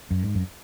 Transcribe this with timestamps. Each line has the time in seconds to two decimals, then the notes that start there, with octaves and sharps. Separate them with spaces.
0.11 F#2
0.23 G#2
0.35 F#2